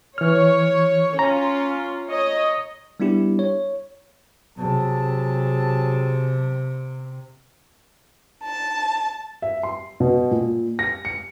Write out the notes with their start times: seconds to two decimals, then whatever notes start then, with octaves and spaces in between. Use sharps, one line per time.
0.18 E3 C#5 F6
1.19 C#4 F4 A#5
2.07 C#5 D#5
3.00 G3 B3 D4 E4 G4
3.39 C#5
4.57 C3 F#3 G#4 A5
8.44 A5
9.42 E5
9.63 C6
10.00 B2
10.31 A#2
10.79 A#6
11.05 C#7